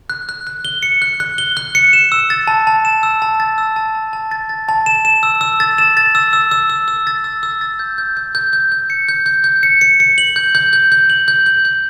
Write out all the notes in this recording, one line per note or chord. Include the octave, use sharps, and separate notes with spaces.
F#6
F#6
F#6
G7
C#7
F#6
F#6
G7
F#6
C#7
E7
E6
A6
A5
A5
E7
E6
A5
A6
E6
A5
A5
A5
A6
A6
A5
E7
E7
E6
E6
A6
E7
A6
E6
E6
E6
E6
E6
A6
E6
E6
A6
G6
G6
G6
G6
G6
G6
C#7
G6
G6
G6
C#7
C#7
C#7
F#7
G6
G6
G6
G6
F#7
G6
G6
G6